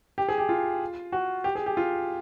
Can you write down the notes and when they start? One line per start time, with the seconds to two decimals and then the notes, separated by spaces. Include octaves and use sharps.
0.18 G4
0.28 G#4
0.38 G4
0.49 F4
1.12 F#4
1.44 G4
1.55 G#4
1.66 G4
1.77 F4